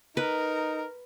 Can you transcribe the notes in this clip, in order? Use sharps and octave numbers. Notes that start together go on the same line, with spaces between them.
D#4 A#4 B4